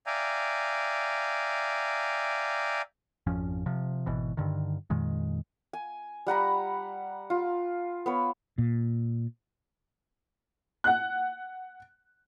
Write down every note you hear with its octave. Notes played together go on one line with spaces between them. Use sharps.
D5 E5 F5 G5 G#5 A#5
G#1 F2 F3 C#4
C3 F3
G#1 B2 E3
G2 D3 D#3
F2 A#2 D#3 G#3
G#5
G3 F#5 A#5 B5
F4
B3 B4 C#5
A#2
F#5 F#6